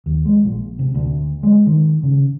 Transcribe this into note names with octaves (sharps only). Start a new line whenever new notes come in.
D#2
G#3
A#1
C3
D2
G#3
D#3
C#3